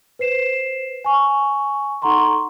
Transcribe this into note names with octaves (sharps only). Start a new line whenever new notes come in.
B4 C5 C7 E7
G#5 C#6
D#4 A4 F#5 A#5 C6 C#6